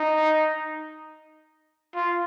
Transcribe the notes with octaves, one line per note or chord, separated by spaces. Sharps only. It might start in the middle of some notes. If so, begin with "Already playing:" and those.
Already playing: D#4
F4